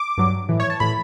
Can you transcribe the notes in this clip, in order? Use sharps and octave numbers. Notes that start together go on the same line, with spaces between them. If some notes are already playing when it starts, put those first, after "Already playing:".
Already playing: D6
G2 F#3
A2 E3
C#5
A5
A2 E3 B5